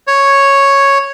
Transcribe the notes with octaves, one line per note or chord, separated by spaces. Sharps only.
C#5